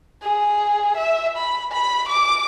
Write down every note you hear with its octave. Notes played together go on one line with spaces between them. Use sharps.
G#4
E5
B5
B5
D6